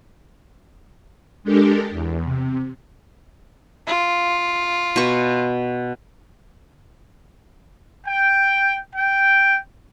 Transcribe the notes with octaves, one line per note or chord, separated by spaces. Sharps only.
G#3 D4 G4 A4 A#4
E2
C3
F4
B2 C#6
G5
G5